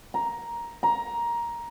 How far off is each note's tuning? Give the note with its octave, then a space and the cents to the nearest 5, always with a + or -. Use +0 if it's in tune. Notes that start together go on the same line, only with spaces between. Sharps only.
A#5 +10
A#5 +15